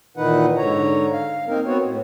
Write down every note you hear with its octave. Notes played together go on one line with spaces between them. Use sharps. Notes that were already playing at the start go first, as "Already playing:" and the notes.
A#2 D#3 E3 D#4 B4 F#5
G#2 D3 C#5 A#5
F5
A#3 C4 D#4 A#4
B3 C4 F#4 C#5
A2